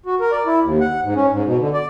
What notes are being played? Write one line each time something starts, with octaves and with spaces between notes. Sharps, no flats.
F#4
A#4
D5
E4
D#2
F#5
G#2
C#4
G#2
B2
D3
D5